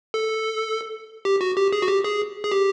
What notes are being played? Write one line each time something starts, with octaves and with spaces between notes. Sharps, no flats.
A4
G4
F#4
G4
G#4
F#4
G4
G#4
G#4
G4